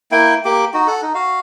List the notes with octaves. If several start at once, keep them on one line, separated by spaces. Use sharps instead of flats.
A#3 E4 G5
A#3 G4 D6
D#4 F#4
A4 F#5
D#4
F#4 F5